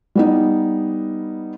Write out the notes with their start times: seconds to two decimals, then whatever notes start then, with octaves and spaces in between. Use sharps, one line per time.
0.15 G3 B3 D#4